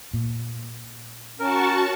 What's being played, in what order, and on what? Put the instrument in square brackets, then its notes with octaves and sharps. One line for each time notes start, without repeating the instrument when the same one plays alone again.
[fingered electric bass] A#2
[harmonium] C#4 [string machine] F#4 A5 C#6 [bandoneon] A#4